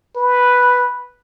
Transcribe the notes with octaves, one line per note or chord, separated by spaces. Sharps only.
B4